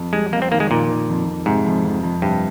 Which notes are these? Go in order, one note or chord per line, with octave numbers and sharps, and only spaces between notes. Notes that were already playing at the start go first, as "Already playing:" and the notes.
Already playing: F2
G3 G#3
F2 A#3
C4
D#3 A#3
G#3
A#2 D#3
D#3
F2
F2
G#2 C3
F2
F2
F2
G2 C3